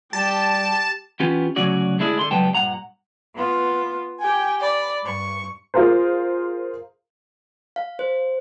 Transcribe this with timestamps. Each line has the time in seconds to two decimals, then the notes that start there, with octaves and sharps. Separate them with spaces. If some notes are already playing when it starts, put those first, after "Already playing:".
0.13 G3 G4 A5
1.20 E3 B3 C#4 F4 G4
1.56 D2 C#3 F#3 C#4 F#4 D5
1.98 D2 G#3 D4 E4 G#4
2.19 D3 C6
2.31 C#2 F#3 G3 B3 G5 A5
2.55 G2 A#2 F#5 A#5
3.33 B3 F4
4.20 G4 G5 G#5
4.59 D5 B5
5.03 G2 C#6
5.74 F4 G#4 A#4 C5
7.76 F5
7.99 C5